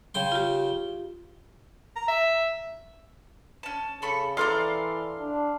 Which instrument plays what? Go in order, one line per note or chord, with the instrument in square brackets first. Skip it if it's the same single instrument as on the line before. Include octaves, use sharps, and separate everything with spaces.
[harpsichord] C#3 G5 C6
[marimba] F4 G4
[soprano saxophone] A#5
E5
[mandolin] C#4 A5
[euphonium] C#3 [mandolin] A4 B5 C#6
[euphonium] E3 [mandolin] A4 D5 A#5 [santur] F5 C6
[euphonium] D4